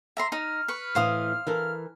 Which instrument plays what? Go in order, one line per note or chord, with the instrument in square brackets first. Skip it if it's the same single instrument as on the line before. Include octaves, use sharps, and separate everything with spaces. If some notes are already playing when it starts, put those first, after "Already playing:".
[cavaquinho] E5 A#5 C6
[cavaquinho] D#4 [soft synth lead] F6
[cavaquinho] B4 C#6
[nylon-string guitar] A2 E3 [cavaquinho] C5 F5 D#6
[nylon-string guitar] E3 A4 A#4